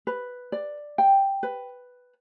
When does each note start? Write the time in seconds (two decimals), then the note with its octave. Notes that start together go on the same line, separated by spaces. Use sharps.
0.07 B4
0.52 D5
0.98 G5
1.43 B4